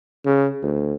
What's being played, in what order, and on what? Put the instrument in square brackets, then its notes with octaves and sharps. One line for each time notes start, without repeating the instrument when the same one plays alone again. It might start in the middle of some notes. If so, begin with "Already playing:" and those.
[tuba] C#3
D2